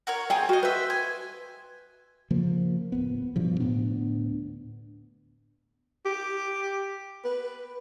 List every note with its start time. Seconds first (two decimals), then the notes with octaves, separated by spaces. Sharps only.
0.07 F#4 A#4 C#5
0.30 C4 F4 G#4 G5
0.49 F#4 D#5 F5
0.63 B4 C5 E5
0.90 G#5
2.30 C#3 F3 A#3
2.92 D1 C#2 B3
3.36 G2 B2 F3
3.60 D2 A2 B3 D4
6.06 G4
7.25 B4